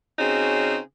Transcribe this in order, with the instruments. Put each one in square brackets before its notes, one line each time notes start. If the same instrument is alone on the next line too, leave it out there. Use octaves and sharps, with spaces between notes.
[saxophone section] C#3 C4 C#4 D#4 F#4 G#4